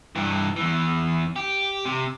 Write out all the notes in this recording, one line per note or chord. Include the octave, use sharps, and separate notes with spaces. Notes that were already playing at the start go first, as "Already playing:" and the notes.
G2 E3
E2 E3
G4
C3